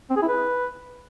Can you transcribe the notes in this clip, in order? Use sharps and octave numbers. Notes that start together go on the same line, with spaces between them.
C4
G#4
E4
B4